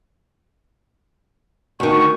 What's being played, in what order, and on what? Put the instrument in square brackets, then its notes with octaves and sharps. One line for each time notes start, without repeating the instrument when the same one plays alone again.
[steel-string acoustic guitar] D2 D#3 [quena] C#6